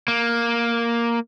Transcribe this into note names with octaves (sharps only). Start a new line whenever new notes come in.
A#3